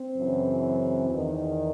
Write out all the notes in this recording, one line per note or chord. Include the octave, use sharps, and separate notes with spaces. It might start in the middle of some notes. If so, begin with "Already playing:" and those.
Already playing: C4
F#2 C#3 E3
E2 D#3